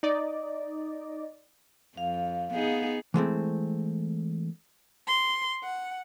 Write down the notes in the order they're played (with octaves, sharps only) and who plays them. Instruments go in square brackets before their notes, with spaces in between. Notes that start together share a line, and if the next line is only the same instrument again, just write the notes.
[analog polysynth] D#4 D5 D#5
[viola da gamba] F2 [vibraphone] F5
[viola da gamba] B3 D#4 G#4
[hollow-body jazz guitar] E3 G#3 A3 C4
[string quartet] C6
F#5